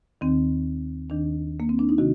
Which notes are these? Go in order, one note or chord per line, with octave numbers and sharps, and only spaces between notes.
D#2 D#3 C4
D#2 D#3 D4
A#3
C4
D4
D#4
C3 D#3 F#4